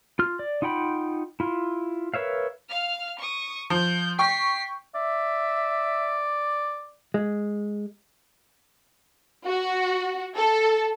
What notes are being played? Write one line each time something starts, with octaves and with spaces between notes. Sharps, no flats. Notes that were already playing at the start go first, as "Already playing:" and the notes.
F4 F6
D5
D#4 F4 F#5 G5 B5
E4 F4
A#4 B4 C#5 E5 F5
F5 F6
C#6 D#6
F3 G6
G5 C#6 B6 C7
D5 E5
G#3
F#4
A4